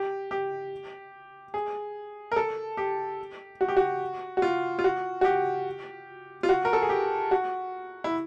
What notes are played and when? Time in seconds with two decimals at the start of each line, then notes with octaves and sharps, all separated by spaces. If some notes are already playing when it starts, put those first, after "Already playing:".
Already playing: G4
0.31 G4
1.54 G#4
2.32 A#4
2.36 A4
2.77 G4
3.61 F#4
3.68 G4
3.77 F#4
4.37 F#4
4.42 F4
4.79 F4
4.84 F#4
5.21 F#4
5.24 G4
6.43 F4
6.49 F#4
6.65 A#4
6.73 A4
6.82 G#4
6.89 G4
7.31 F#4
8.04 E4